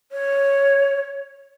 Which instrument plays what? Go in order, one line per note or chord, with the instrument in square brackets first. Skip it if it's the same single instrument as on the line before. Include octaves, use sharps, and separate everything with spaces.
[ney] C#5